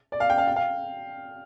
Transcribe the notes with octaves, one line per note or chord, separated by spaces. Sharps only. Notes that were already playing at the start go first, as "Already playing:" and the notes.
D5
F5
G5
F5
G5
F5